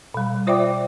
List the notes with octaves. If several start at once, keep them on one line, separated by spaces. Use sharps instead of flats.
B2 G3
F4 C5 D5 E5 G5 D6